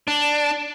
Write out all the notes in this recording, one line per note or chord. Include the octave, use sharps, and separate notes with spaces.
D4